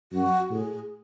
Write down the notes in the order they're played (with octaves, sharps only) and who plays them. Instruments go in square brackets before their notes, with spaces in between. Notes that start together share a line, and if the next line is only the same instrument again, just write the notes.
[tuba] F#2 [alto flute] F#4
[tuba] A2 [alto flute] G#4